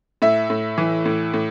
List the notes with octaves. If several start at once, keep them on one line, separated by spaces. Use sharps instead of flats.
A2 E5
A2
E3
A2
A2